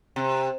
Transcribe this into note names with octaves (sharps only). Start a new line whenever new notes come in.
C3